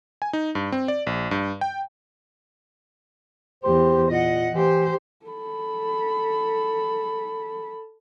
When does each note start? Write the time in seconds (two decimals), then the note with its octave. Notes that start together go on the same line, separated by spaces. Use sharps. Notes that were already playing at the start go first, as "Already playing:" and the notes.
0.22 G#5
0.33 D#4
0.55 G2
0.72 C4
0.88 D5
1.07 A#1
1.31 G2
1.61 G5
3.64 E2 G4 C5
4.11 A#2 D#5 F#5
4.53 E3 G4 C5
5.26 A4 B5